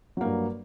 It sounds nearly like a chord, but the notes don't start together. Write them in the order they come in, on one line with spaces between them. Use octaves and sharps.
F#3 A#3 G2